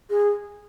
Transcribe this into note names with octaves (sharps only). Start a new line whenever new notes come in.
G#4